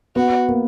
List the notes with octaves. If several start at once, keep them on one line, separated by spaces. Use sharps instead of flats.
B3 F#4
A#3